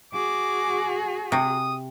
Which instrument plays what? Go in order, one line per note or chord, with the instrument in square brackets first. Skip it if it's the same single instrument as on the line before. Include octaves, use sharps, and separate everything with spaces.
[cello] F#4 G#4 [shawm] D6
[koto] C3 [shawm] D#6